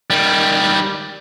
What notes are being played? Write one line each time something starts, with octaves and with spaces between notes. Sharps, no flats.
D#3 G3